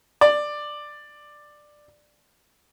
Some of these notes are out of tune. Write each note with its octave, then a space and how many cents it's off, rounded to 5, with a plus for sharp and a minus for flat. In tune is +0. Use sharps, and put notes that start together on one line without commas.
D5 +10